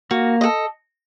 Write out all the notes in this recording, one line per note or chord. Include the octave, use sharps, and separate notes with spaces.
A#3 F#4
A4 D#5